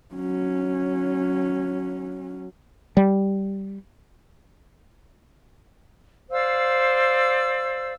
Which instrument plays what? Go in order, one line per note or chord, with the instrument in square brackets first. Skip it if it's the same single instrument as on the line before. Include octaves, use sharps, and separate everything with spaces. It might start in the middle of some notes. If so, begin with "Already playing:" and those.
[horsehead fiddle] F#3 C#4
[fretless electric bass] G3
[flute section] C5 D5 F5 E6